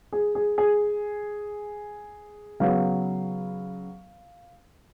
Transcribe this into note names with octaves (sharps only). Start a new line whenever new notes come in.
G#4
G#4
G#4
C#3 F#3 B3 F5